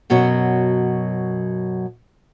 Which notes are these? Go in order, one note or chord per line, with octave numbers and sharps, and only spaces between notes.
F#2 B2 F#3 F#4